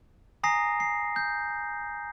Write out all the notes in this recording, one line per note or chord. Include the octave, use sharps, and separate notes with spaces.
G#5 A#5 D#6 A#6 C7
C7
G6